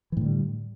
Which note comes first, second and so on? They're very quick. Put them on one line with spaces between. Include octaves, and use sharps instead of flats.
E3 A2 D3 G3